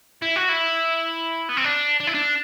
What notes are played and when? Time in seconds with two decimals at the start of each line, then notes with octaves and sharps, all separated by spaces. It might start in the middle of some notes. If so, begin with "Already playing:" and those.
0.22 E4
0.36 F#4
0.49 E4
1.49 B3
1.57 C4
1.64 D4
2.00 D4
2.07 E4
2.15 D4